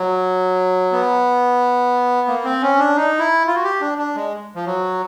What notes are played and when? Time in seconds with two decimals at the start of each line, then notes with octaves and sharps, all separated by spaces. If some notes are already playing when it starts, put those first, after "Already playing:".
Already playing: F#3
0.92 B3
2.28 A#3
2.44 C4
2.62 C#4
2.79 D4
2.96 D#4
3.19 E4
3.47 F4
3.55 F#4
3.64 G4
3.81 D4
3.98 D4
4.15 G#3
4.56 F3
4.66 F#3